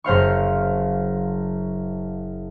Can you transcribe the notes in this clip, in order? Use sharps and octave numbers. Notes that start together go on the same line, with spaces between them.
F#1 C5 F5 C#6